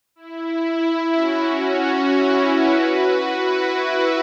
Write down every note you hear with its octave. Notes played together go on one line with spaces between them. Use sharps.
E4
E4
C#4 F#4
E4
F#4 B4
F#4 B4
F#4 B4
E4